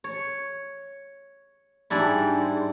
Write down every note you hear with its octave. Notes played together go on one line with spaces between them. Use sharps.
C#5
G#2 G3 D4 E4